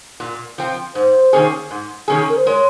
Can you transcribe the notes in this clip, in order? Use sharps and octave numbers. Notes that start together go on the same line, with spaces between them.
A#2
F3 C4
G#2 C5
D#3 A#3 C#4 G#4
G#2
D#3 A#3 C#4 G#4
A#4
C5
G#3 C#5